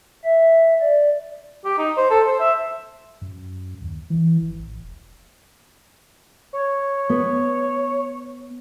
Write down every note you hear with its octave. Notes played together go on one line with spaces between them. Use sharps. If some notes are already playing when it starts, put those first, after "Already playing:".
E5
D5
G4
D#4
C5
A4
C5
E5
F#2
D#2
E3
G1
A1
E1
C#5
B3